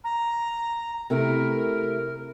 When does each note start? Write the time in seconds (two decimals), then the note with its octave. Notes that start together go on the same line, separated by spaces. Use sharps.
0.04 A#5
1.10 C3 A3 E4 A#4